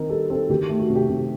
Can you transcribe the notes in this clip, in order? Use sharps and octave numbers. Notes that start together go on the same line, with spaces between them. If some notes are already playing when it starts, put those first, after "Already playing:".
Already playing: D#3 C4 D#4 A#4
G3 A4
C4 A4
D#3 G4
A3
F#4
C3
G4
C3